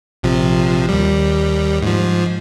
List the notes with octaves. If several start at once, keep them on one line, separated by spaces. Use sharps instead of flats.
A#1 C3 F3
D#2 G3
G#2 F3